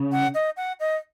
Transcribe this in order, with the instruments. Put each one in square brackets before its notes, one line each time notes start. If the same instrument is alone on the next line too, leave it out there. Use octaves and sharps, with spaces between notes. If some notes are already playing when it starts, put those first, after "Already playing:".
Already playing: [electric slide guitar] C#3
[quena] F#5
D#5
F#5
D#5